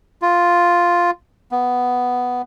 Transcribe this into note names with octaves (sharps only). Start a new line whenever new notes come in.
F4
B3